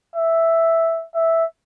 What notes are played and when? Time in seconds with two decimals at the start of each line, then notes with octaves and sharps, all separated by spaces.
0.16 E5
1.15 E5